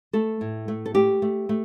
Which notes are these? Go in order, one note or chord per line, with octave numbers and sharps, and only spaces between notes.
A3 A4
A2
A3
A4
A3 G4
A3
A3